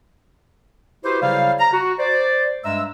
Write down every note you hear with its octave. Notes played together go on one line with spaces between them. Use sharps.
E4 F#4 G4 B4 C5
C#3 F#3 G3 E4 C5 F5
A#5
F#4
C5 D5
G2 G3 G#3 E5 A#5 E6